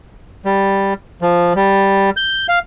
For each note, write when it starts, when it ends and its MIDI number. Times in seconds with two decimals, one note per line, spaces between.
0.45 0.94 55
1.22 1.53 53
1.56 2.10 55
2.17 2.47 91
2.49 2.59 77